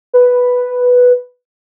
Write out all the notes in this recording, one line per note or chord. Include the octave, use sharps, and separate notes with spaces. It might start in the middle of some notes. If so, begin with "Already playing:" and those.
B4